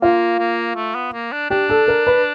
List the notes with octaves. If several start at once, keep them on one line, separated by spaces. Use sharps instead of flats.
A#3 F4
A#3
A3
B3
A#3
D4
D4 G4
A4
A#4
B4